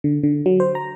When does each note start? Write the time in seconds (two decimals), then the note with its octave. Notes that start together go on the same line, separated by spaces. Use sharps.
0.04 D3
0.23 D3
0.46 F#3
0.60 C5
0.75 A#5